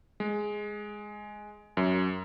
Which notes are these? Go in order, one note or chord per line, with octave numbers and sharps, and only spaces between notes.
G#3
F#2